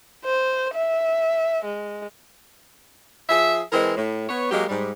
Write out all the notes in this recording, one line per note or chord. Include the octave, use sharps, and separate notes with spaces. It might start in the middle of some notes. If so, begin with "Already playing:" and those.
C5
E5
G#3
F3 G#4 E5
E3 G#3 C4 A#4
A2
B3 C#5
F#3 G#3 A#3 G4
G#2 G3